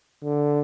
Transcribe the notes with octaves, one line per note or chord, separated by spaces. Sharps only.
D3